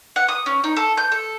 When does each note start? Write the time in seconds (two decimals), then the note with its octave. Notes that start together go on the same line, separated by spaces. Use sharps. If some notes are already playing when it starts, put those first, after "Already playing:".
0.16 F#5
0.28 D#6
0.46 C#4
0.64 D#4
0.76 A4
0.97 G6
1.12 A4